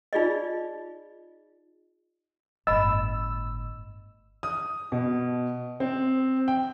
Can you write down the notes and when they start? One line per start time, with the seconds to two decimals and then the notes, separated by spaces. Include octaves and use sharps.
0.13 D#4 F4 G#4 D5 D#5
2.67 G1 A2 D#5 B5 E6
4.43 D#6
4.92 B2
5.80 C4
6.48 G5